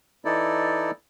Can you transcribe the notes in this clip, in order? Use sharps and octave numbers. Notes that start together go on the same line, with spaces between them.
E3 D#4 E4 A4 D5